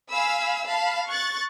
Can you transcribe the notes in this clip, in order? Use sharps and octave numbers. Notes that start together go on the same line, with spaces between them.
F5 G#5 B5 E6
F5 A5 B5
C#6 F#6 A6